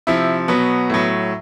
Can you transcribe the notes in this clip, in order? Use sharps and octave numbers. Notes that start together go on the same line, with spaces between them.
C3 F3 E4
B2 F#3 B3
A2 F#3